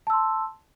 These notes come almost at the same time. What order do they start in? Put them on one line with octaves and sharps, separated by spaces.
A5 E6 C6